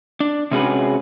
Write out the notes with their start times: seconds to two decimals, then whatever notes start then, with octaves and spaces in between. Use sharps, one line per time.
0.20 D4
0.51 C3 G#3 C#4 F#4 G#4 B4